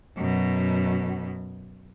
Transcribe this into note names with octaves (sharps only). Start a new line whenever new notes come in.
F#2 B2